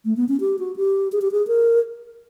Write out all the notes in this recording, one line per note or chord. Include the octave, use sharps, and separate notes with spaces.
A3
B3
C#4
G4
F#4
G4
G#4
G4
G#4
A#4